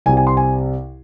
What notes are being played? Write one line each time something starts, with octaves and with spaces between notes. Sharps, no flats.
C2 C3 G3 G#5
G#5
C6
G#5